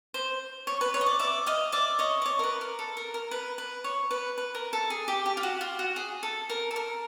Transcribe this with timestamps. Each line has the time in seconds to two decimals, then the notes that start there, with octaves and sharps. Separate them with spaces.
0.14 C5
0.67 C#5
0.81 B4
0.94 C#5
1.01 D#5
1.06 D5
1.19 D5 E5
1.47 D#5 F5
1.72 D5 E5
1.99 C#5 D#5
2.22 D5
2.26 C#5
2.39 A#4
2.44 B4
2.61 A#4
2.79 A4
2.97 A#4
3.14 A#4
3.31 B4
3.58 B4
3.84 C#5
4.11 B4
4.38 B4
4.55 A#4
4.73 A4
4.90 G#4
5.08 G4
5.26 G4
5.37 F4
5.43 F#4
5.61 F4
5.79 F#4
5.96 G#4
6.23 A4
6.50 A#4
6.71 A4
6.76 A#4